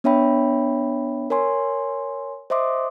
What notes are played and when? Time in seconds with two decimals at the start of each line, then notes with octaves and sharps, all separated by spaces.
0.04 B3 D4 C#5 E5 G5 B5
1.30 A#4 C#5 G#5 C6
2.50 C5 D#5 E5 C6 D6 D#6